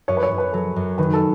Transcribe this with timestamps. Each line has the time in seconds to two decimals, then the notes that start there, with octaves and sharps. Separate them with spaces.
0.08 F#2 C#5
0.17 B4
0.23 C#5
0.31 F#2
0.38 B4
0.53 F#3 A4
0.76 F#2
0.98 D#3 B4
1.13 A4